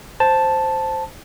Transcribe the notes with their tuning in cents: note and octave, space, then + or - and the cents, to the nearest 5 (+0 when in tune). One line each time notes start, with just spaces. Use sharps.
C5 +0 A5 +0